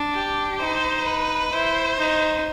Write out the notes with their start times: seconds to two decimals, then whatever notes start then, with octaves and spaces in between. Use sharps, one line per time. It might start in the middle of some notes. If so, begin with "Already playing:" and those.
Already playing: D4
0.13 G4
0.59 D#4 C5
1.06 B4
1.52 E4 C5
1.99 D#4